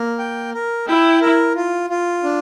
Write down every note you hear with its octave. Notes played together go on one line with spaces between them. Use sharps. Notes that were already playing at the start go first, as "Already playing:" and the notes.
Already playing: A#3
G5
A#4
E4 G5
A#4
F4
F4
D4